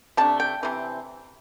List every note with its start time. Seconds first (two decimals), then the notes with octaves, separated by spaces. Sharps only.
0.17 C3 A3 D4 A5
0.40 G5
0.63 C3 E3 C4